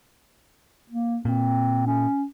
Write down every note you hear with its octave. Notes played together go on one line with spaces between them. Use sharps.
A#3
A#2 C4
C#4